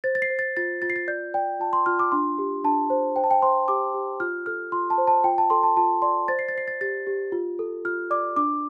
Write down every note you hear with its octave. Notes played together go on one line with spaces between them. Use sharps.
C5 A6
A6
C7
C5
A6
F4 A6
F4 A6
C7
A6
D5 G6
D5 G5
F4 A5
C6
F4 F6
D6
D4 C6
G4
D4 A5
C5
C5 G5
A5
G5
C5 C6
G4 D6
G4
F4 F6
A4 F6
F4 C6
A5
C5
A5
F4 G5
A5
A4 C6
A5
F4 A5
D5 C6
C5 A6
C7
A6
C5 C7
A6
G4 A6
G4
F4
A4
F4 F6
D5 D6
D4 D6